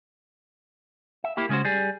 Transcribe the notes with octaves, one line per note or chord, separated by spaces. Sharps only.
E5
A#3 E4 G4
C#3 G#3 C#4 F#4 C5
G3 G#4